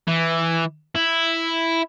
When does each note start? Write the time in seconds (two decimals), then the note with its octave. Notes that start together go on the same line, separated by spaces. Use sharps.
0.07 E3
0.96 E4